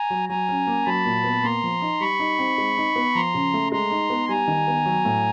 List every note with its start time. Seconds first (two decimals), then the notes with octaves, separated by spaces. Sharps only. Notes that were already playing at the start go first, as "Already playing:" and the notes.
Already playing: G#5 A#5
0.10 F#3
0.29 F#3 G#5 A#5
0.49 C#4
0.67 A#3
0.86 F#3 A5 B5
1.05 A#2
1.24 B3
1.43 A#3 A#5 C6
1.63 F3
1.82 D#4
2.00 G3 B5 C#6
2.19 D#4
2.39 C4
2.58 G#3
2.77 D#4
2.96 B3
3.15 F3 A#5 C6
3.34 C#3
3.54 A3
3.72 G#3 A#5 C6
3.91 D#4
4.10 B3
4.29 G3 G#5 A#5
4.48 D#3
4.67 B3
4.86 F#3
5.05 A2